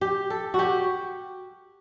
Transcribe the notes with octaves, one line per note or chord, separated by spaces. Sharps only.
G4
A4
F#4
G4